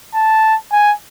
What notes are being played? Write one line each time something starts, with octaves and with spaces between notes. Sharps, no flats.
A5
G#5